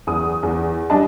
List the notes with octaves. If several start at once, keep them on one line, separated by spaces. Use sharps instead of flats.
E2 D#6
E2
G3 D4 D#5 A5